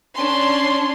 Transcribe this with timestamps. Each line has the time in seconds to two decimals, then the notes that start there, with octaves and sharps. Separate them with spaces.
0.15 C#4 D4 C6